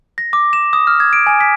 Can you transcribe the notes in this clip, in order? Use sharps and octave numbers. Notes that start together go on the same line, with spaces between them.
A#6
D6
E7
D#6
F6
G#6
D7
G#5
B6